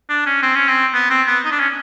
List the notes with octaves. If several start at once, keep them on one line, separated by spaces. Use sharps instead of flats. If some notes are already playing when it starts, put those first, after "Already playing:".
D4
C#4
C4
C#4
C4
B3
C4
B3
D#4
D4
C#4